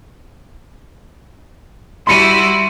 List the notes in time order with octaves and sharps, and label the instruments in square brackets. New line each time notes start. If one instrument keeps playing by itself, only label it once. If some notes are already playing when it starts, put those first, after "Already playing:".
[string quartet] G3 E4 F#4 [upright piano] B5 C#7 [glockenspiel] C6 D#7